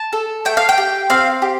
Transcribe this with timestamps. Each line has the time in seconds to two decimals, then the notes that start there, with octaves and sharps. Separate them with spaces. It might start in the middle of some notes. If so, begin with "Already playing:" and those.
Already playing: A5
0.13 A4
0.45 A3 G5
0.57 F5
0.69 G5
0.78 G4
1.10 C4 F5
1.42 G4